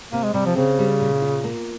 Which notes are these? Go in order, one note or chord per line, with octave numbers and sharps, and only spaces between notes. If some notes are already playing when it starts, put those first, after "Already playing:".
C3 A#3
G#3
C3 G3
F3
C#3 C4
G3
A#2
F4
A#3